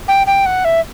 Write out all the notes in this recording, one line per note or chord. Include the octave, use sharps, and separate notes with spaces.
G5
G5
F#5
E5